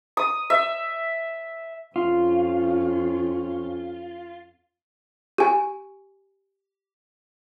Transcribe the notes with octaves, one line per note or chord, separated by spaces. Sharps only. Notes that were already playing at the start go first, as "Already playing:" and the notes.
D#6
E5
F2 C#4 F4
G4 G#5